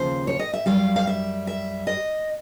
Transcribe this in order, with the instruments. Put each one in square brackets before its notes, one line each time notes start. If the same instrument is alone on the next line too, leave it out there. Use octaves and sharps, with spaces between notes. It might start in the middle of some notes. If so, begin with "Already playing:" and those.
Already playing: [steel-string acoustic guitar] D#2 C#3 F3 C5
C#5
D#5
E5
F#2 D#3 G3 F5
F5
E5
E5
D#5